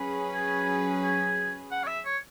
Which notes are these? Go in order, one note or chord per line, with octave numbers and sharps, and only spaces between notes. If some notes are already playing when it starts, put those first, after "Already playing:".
Already playing: F#3 C#4 G#4 B4
G#5
G#5
F#5
C#5
E5
C#5